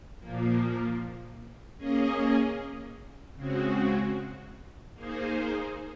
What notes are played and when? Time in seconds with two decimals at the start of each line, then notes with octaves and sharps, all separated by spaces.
0.19 A#2 F3 A#3
1.78 A#3 C#4 G#4 D#5
3.35 C#3 G#3 C4 F#4
4.94 A#3 D#4 G#4 C5